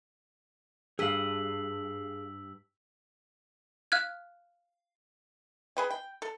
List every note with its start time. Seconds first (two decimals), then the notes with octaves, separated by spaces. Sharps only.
0.99 G2 G#4 F5 E6 B6 F#7
3.92 F5 F6 F#6 G#6
5.77 G#4 B4 G5
5.90 G5
6.22 A4